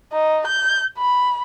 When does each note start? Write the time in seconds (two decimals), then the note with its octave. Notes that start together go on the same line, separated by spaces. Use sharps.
0.13 D#4
0.47 G6
0.98 B5